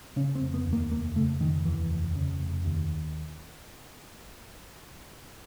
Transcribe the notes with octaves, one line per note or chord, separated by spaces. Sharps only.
C#3 C#4
C4
F1
B3
D#2
A#3
F1 A#3
C#3 A3
F1 D#3
D#2 E3
F1
C#3
F1
D#2